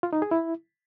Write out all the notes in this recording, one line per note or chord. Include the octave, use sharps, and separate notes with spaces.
F4
D#4
G#4
E4